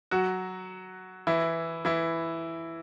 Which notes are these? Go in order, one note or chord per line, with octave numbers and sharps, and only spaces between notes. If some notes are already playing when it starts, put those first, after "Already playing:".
F#3 F#4
E3 E4
E3 E4